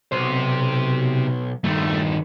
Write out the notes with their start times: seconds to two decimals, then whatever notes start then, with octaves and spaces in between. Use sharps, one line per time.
0.12 B1 C3 C5
1.64 G2 D#3 A3